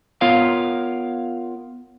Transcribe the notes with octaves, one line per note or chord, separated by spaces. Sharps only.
B3 F4 A#4 C#5 F5